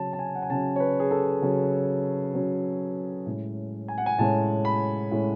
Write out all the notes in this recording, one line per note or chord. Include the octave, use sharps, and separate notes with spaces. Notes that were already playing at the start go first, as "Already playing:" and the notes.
Already playing: C#3 F#3 C#4 A5
A5
G#5
F#5
G#5
C#3 F#3 C#4 A5
C#5
B4
G#4
A4
C#3 F#3 C#4
C#3 F#3 C#4
A2 G#3 C#4
G#5
F#5
G#5
A2 G#3 C#4 A5
B5
A2 G#3 C#4